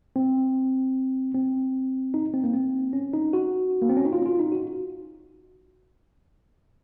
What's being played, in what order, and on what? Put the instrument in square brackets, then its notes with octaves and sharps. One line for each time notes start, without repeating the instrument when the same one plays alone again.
[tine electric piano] C4
C4
D#4
C4
A#3
C4
C#4
D#4
F#4
A#3
C4
C#4
D#4
F4
F4
D#4
F#4